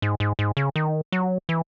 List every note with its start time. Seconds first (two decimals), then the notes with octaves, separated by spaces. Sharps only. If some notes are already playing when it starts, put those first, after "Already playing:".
0.02 G#2
0.20 G#2
0.39 G#2
0.57 C#3
0.76 D#3
1.12 F#3
1.49 E3